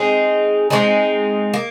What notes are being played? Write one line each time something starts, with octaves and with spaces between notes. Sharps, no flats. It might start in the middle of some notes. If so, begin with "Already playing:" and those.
Already playing: G#3 C4 D#4 G#4
G#3 C4 D#4 G#4
A#3